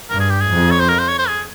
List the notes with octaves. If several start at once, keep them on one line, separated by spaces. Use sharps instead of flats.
G2 A#4
G#4
G4
G#4
F2
C#5
C5
A#4
C5
C#5
C5
G#4